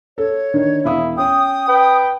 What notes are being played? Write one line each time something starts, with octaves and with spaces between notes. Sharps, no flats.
A4 C#5
D3 D#3 D4
E1 E4 F5 D#6
C#4 G5 D#6
B4 G5